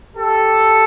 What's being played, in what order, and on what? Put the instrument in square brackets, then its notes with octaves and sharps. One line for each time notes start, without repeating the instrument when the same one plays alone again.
[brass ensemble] G4 A4